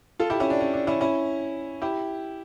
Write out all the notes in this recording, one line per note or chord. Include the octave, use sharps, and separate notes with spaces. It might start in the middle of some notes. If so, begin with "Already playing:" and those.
F4 A4
E4 G4
C#4 E4
D4
C#4
D4
C#4 E4
C#4 E4
E4 G4